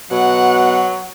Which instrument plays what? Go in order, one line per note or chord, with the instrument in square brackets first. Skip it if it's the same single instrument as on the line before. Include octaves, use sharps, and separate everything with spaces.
[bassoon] B2 [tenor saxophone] F#3 [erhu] F#5